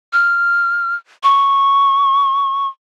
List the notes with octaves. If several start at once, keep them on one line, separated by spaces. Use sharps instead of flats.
F6
C#6